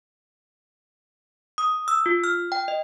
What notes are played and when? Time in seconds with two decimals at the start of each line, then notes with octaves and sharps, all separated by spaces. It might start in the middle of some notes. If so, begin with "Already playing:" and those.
1.58 D#6
1.88 E6
2.06 F4
2.24 F6
2.52 G5
2.68 D#5